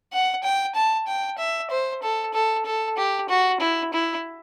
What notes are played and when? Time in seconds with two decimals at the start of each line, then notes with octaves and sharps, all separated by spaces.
0.12 F#5
0.43 G5
0.75 A5
1.07 G5
1.38 E5
1.71 C5
2.02 A4
2.34 A4
2.66 A4
2.97 G4
3.29 F#4
3.60 E4
3.93 E4